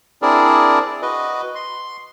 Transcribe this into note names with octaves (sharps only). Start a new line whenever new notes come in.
C4 D4 E4 G#4 A#4 D5
F#4 B4 D#5
C6